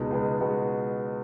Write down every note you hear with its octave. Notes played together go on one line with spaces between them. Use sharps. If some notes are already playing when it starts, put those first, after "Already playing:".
Already playing: C#2 B2 G#3 B3 D#4
C#2 B2 G#3 B3
B2 G#3 B3 F#4